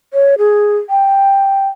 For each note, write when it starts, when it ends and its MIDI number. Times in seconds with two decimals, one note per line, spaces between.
0.13 0.35 73
0.38 0.77 68
0.90 1.67 79